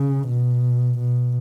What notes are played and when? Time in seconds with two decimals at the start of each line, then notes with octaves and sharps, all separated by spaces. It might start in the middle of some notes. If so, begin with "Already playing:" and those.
Already playing: C#3
0.28 B2
0.98 B2